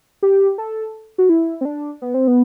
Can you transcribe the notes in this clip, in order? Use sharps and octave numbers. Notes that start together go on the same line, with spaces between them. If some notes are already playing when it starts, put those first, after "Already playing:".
G4
A4
F#4
E4
C4
D4
B3
C4
B3